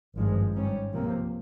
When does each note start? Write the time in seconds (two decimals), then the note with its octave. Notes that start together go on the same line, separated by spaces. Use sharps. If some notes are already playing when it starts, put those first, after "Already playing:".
0.16 G#1 G2 F3 G#3
0.54 G#2 G3 C#4
0.93 C#2 C3 F3 A#3